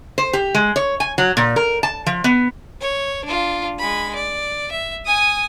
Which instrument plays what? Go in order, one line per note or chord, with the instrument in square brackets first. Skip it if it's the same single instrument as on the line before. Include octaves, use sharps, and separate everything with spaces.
[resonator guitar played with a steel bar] C5
G4
G#3
C#5
G#5
F#3
A#2
A#4
A5
F3
B3
[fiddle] C#5
D4 F4
G#3 B5
D5
E5
G#5 D#6